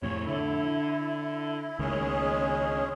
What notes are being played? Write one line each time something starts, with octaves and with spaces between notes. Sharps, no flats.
F2 A2 C3 C#5
D3 E4
C#2 D#3 G#3 C#4 G#4